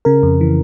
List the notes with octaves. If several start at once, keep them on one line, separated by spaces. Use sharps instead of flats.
C#3 A#4
F2
E3